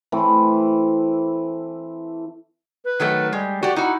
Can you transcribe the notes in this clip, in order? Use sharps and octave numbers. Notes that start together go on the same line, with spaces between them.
E3 A3 C4
B4
D#3 F#3 A3
G3 G#3
F#4 G4 D5
D#4 E4 F#4